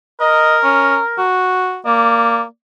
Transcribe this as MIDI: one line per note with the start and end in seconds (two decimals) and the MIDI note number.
0.21 1.25 70
0.21 0.58 75
0.64 0.98 61
1.19 1.79 66
1.85 2.44 58
1.85 2.42 74